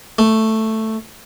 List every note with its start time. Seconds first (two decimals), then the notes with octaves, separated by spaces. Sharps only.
0.19 A3